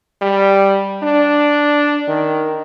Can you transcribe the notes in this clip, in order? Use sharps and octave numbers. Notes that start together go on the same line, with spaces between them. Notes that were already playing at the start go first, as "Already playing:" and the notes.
G3
D4
D#3